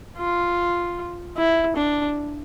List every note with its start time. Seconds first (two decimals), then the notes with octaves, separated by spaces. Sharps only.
0.18 F4
1.37 E4
1.76 D4